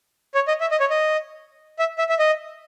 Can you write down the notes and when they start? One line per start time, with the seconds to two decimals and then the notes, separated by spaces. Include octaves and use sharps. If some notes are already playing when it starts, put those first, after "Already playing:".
0.35 C#5
0.48 D#5
0.61 E5
0.71 D#5
0.80 C#5
0.90 D#5
1.79 E5
1.99 E5
2.09 E5
2.19 D#5